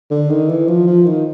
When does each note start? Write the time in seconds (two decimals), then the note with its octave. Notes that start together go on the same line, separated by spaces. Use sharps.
0.11 D3
0.30 D#3
0.49 E3
0.68 F3
0.87 F3
1.06 D#3